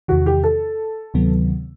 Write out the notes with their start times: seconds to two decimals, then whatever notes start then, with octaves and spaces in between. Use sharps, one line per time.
0.08 E2 C3 D#3 F#4
0.26 G4
0.44 A4
1.14 D2 C3 D#3 F#3 B3